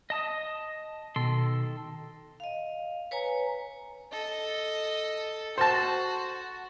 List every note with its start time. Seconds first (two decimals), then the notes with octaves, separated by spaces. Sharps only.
0.10 D#5 A5 D#6
1.16 B2 D#3 A4 C6
2.40 D#5 F5
3.11 B4 C#5 G#5 A#5
4.12 A4 D#5
5.58 F#4 C5 A5